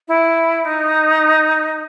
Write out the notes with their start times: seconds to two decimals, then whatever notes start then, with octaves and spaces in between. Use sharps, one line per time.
0.08 E4
0.65 D#4